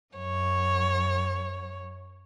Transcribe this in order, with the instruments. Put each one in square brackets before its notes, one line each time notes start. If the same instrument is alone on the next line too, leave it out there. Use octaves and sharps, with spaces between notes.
[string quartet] F#2 C#5